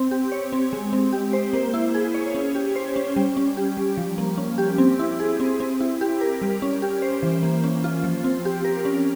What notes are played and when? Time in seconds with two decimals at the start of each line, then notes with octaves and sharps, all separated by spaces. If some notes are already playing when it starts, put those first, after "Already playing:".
Already playing: C4
0.11 G4
0.32 C#5
0.53 C4
0.73 G#3
0.93 C4
1.13 G4
1.33 C5
1.53 A#3
1.74 E4
1.94 G#4
2.15 C#5
2.35 C#4
2.55 G4
2.76 C5
2.96 C#4
3.16 G3
3.37 C#4
3.57 G4
3.77 G3
3.97 F3
4.18 A#3
4.38 C#4
4.58 G4
4.78 C4
4.99 E4
5.20 G#4
5.40 C4
5.60 C4
5.80 E4
6.01 G4
6.21 A#4
6.42 G3
6.62 C#4
6.82 G4
7.02 C5
7.23 E3
7.43 A#3
7.64 C#4
7.84 F4
8.04 F3
8.24 C4
8.45 G4
8.65 A#4
8.85 C#4